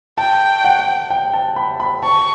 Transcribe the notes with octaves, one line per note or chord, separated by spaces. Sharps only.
G5 A5
F#5
G5
A5
B5
B5
A5 C#6